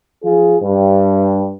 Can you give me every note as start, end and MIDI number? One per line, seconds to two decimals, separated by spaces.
0.23 0.56 53
0.23 0.56 65
0.23 0.56 68
0.62 1.53 43